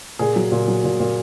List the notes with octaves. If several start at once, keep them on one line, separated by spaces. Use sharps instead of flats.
A#2 G#4
F#3
A#2
F#3
A#2
A#2